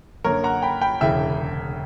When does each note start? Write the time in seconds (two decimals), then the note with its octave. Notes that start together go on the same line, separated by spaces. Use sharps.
0.24 F#2 D3 A#3 A#4 C#5
0.44 F#5 A#5
0.62 G5 B5
0.81 G5 B5
1.01 E1 D2 C#3 E3 E5 G5